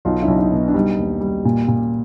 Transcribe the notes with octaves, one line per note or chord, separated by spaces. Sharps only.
B1 D#4 F4
D4 E4
B1
D#4
B2
D4
G3 D#4
D#2
G3
A#2
A#2